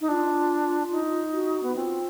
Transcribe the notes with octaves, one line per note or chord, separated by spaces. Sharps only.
D#4
D4 F4
D#4
F#4
B3
C4 F4